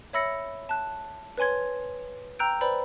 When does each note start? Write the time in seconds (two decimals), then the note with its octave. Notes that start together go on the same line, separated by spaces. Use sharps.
0.13 C#5 E5 B5 E6 A#6 C#7
0.69 A5 F#6
1.37 B4 C#5 G#5 C6 G#6
2.39 G5 A#5 E6 F#6 G6 D7
2.61 B4 C5 D5 B5